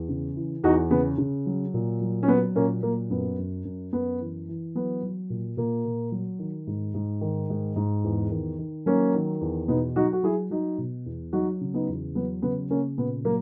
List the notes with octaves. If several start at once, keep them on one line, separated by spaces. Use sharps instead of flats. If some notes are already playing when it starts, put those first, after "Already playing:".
Already playing: E2
C#3
E3
E2 D#4 F#4
C#3 B3
C#3
F#3
A#2
F#3
C#4
F#3 B3
A#2 A#3 C#4
F#3 A#3
F#2 B3
F#2
F#2
F#2 B3
E3
E3
F#3 B3
F#3
A#2
A#2 A#3
A#2
F#3
D#3
G#2
G#2
D#3
G#2
G#2
E2
D#3
D#3
F#3 A#3 C#4
D#3
E2
B2 B3 D#4
F#3 D#4 F#4
F#4
F#3 E4 G#4
F#3 D#4 F#4
B2
E2
F#3 D#4 F#4
C#3
B3 D#4
E2
F#3 B3
C#3 B3
C#3 A#3 C#4
A#2 B3
F#3 A#3